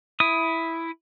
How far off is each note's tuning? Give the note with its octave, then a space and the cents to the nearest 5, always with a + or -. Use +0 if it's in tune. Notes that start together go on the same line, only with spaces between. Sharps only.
E4 +0 D#6 +15